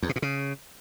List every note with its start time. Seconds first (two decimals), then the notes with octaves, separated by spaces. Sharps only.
0.03 E2
0.09 B2
0.16 A#2
0.22 C#3